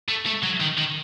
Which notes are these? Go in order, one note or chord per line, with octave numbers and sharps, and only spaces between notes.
A3
A3
F#3
D#3
D#3